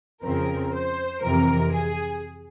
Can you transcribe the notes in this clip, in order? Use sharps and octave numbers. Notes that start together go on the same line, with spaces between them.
F2 C#3 F3 C4 A#4
C5
F2 C3 E3 A#4
G#4